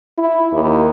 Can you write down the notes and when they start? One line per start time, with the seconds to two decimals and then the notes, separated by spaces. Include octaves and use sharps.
0.18 E4
0.52 D#2